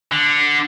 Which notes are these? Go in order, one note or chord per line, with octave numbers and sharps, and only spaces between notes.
D3